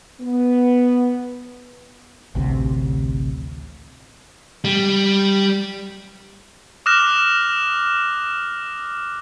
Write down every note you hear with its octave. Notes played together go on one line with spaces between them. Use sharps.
B3
A1 D2 C3
G3
D6 D#6 F6 F#6 A#6 E7